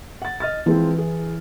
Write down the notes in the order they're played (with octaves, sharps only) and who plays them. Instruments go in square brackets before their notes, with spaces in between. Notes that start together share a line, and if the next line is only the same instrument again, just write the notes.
[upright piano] F#5 A6
D#5 F6 A6
[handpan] E3 [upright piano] F3 G#3 C4
[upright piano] G#4